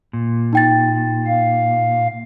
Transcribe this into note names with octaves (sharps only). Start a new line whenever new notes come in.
A#2
D#4 G5 A6
F5